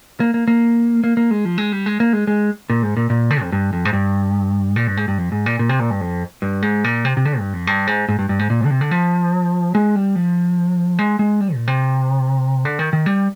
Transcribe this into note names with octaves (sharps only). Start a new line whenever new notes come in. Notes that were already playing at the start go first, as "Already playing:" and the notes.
A#3
A#3
A#3
A#3
A#3
G#3
F3
G#3
G3
G#3
A#3
G#3
G#3
A#2
G#2
A#2
A#2
D3
F2
G2
F2
G#2
G2
A#2
G2
G#2
G2
F2
G#2
A#2
A#2
C3
A#2
G2
F2
G2
G#2
A#2
C3
C3
D3
G2
F2
G2
G#2
G#2
G2
G2
G#2
A#2
G#2
D3
C3
D3
F3
G#3
G3
F3
G#3
G#3
G3
A#2
C3
D3
D#3
D#3
G3